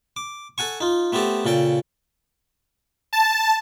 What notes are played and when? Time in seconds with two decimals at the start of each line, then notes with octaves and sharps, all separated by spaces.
0.17 D6
0.58 A4 F#5 G#5 C#6
0.81 D#4 F4
1.12 A3 B3 C4 G4 A4
1.45 A#2 C#3 A4 G5
3.13 A5